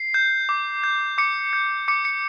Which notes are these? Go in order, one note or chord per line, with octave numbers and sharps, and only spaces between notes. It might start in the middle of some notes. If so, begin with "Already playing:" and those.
Already playing: C7
G6
D6
G6
D6 C#7
G6
D6 C#7
C#7